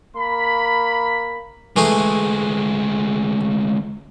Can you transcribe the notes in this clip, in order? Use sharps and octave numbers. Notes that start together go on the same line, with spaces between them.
A#3 B5
D2 E3 G#3 A3 G#4